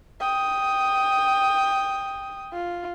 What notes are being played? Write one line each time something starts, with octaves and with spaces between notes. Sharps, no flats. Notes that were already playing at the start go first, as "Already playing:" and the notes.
G5 D#6
F4